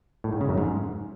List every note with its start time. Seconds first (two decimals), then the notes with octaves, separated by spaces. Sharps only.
0.24 A2
0.33 G#2
0.41 C#3
0.49 F#2
0.58 G#2